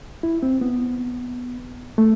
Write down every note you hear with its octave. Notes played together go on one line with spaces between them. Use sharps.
E4
C4
B3
A3